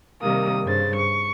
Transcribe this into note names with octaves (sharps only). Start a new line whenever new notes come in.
C3 D#3 G3 A#3 D#6
G2 C#3 C5 A6
C#6